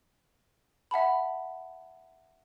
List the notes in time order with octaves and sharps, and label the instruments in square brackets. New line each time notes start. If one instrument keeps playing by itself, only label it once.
[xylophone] E5 F#5 A5 B5